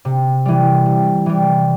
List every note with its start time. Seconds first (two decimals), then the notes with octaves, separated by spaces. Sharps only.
0.05 C3
0.45 E3 G3
0.86 C3
1.26 E3 G3